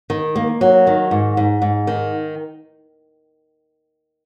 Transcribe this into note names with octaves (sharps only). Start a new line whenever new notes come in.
D#3
A#3
F#3
D#3
G#2
G#2
G#2
D#3